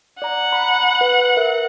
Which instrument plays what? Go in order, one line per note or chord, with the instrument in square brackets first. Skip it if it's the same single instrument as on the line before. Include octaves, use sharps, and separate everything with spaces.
[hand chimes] D5 A#5 [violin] F#5
[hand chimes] A#5 B5
B4
A#4 E5